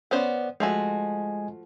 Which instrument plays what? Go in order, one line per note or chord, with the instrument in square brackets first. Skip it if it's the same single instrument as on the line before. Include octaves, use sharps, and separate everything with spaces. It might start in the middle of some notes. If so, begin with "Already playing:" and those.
[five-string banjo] B3 C#4 C5 [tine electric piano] D5 F#5
[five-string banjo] F3 A3 F#4 [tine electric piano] G#3 D#5 G#5